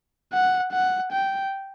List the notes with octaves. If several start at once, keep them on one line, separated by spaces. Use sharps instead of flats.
F#5
F#5
G5